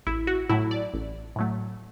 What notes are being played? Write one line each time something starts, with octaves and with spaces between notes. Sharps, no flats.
A1 E4
F#4
A2 F#3 A3 E4
D5
A1
A2 F#3 A3